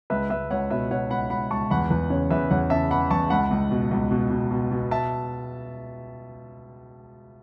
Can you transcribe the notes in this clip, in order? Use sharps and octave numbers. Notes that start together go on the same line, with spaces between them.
C#2 B4 E5
C#2 B4 E5
C#2 C#5 F#5
B2 B4 E5
B2 C#5 F#5
C#2 F#5 B5
C#2 F#5 B5
C#2 A5 C#6
E2 F#5 B5
E2 B4
C#3 C#5
E2 B4 E5
E2 C#5 F#5
C#3 E5 A5
E3 F#5 B5
E2 A5 C#6
C#2 F#5 B5
C#2
B2
C#2
B2
B2
B2
B2
E5 A5